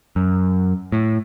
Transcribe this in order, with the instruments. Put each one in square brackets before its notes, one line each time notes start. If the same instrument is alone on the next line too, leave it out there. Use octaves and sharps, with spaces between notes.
[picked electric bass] F#2
A2